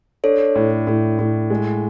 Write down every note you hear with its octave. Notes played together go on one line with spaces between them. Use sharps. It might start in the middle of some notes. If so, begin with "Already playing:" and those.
D4 A4 C#5
A2
A2
A2
G#3